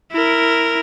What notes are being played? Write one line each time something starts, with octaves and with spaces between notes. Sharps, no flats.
E4 A#4